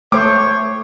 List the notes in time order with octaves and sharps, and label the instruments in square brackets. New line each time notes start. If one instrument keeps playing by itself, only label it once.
[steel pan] A3 C5 [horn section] C#5 [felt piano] D6